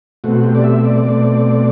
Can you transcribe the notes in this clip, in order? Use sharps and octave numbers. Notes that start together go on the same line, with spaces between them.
B2 A3 C4 F#4
G4
D5
E5
D5
B2 A3 C4